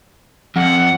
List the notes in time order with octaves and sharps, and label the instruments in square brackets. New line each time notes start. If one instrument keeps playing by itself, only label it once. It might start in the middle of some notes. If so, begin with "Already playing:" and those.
[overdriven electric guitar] F2 [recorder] F#5